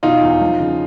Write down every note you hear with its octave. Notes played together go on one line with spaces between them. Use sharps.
B2 D#4 F4
E2
F3
C#3